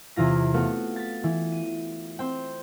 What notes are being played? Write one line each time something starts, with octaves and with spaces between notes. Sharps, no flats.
E2 C3 E3 F4 A#6
A3 B3 F#4 F5 C#7
A6 B6
E3
D#7
C4 G5